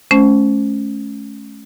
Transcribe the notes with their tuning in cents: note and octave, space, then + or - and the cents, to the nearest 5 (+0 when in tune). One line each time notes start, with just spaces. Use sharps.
A3 -40 C#4 +0 C5 +0